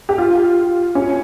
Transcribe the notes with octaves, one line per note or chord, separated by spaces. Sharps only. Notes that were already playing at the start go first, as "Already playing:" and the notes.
G4
F4
C#4